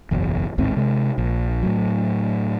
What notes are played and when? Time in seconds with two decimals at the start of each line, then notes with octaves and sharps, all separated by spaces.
0.11 F#1 B1 E2
0.58 A1 D#2 G#2 C4
0.77 C3 G#3
1.18 A#1
1.63 A2 F#3